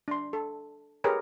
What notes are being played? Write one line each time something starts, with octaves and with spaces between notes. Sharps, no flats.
D4 C6
A4
G4 G#4 A#4 B4 C#5